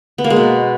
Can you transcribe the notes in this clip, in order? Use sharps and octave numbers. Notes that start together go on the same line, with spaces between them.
B3
A#3
G#3
B2